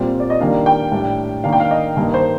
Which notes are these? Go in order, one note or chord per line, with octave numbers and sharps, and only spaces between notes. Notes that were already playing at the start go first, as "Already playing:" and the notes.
Already playing: A#2 G3 C4
D5
D#5
D#3 G3 A#3 D4 F5
G5
A2 G3 D4
D#3 A#3 D4 F5
G5
F5
D#5
G2 D#3 A#3 D#4
C5